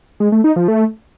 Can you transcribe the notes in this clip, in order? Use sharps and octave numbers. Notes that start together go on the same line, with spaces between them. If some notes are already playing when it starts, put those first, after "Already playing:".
G#3
A3
D#4
F3
A3